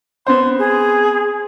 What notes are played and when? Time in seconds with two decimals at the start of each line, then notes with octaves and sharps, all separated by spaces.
0.27 B3 C4 C5 C6
0.59 G#4